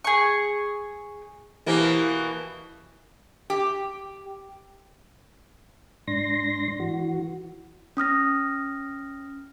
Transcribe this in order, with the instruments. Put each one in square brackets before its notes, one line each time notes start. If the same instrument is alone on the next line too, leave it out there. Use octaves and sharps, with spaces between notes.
[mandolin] G#4 C#6
[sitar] B2 E3 A#3 [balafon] E4 G4 C5
[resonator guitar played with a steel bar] G4
[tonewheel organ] G#2 D4 C6 A#6
E3 F#4
[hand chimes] C#4 D#6 F6 A#6